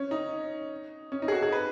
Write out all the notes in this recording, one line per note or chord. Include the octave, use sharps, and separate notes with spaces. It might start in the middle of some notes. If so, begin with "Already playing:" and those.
Already playing: C#4
D#4
C#4
D#4
G#4
F#4
G#4
B4